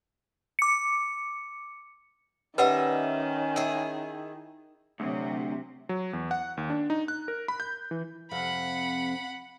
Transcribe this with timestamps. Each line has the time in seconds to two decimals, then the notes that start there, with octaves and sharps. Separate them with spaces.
0.59 D6 C#7
2.58 D#3 G3 C#4 B4 D#5 E5 F#5
3.56 E4 G#4
5.00 D2 C3 F#3
5.89 F#3
6.13 E2
6.31 F#5
6.57 D#2
6.70 D4
6.90 D#4
7.08 F#6
7.28 A#4
7.48 B5
7.60 G6
7.91 E3
8.31 F2 C3 F#5 B5